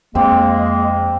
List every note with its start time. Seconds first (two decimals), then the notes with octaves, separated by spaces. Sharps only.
0.15 F2 G#3 A#3 C4